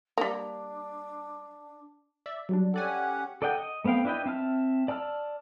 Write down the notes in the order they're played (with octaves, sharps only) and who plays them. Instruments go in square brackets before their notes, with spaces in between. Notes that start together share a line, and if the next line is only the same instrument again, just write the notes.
[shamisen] G3 A#3 [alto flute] D4
[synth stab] D5 E5
F#3 G3 D4
[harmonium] C#4 G4 F#5 [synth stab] A4 D5 G#5
[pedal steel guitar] A4 D5 D#5 F#5 G5
D#5
A3 B3 C4 F5 G5
D4 E4 B4 D#5 G5
C4 E5 A5 F6
D5 A5 E6 F6